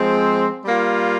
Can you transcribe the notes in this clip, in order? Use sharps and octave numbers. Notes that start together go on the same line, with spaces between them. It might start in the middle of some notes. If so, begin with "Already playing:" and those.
Already playing: F3 G#3 C4
G3 A#3 F4